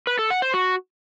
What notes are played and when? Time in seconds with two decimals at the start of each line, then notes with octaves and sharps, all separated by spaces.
0.07 B4
0.19 A4
0.30 F#5
0.42 C5
0.54 F#4